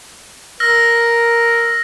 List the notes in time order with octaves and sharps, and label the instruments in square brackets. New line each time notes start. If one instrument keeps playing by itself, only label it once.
[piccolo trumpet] A#4 [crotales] E6 F6 A#6